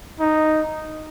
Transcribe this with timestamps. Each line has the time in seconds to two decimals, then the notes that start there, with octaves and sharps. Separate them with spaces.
0.20 D#4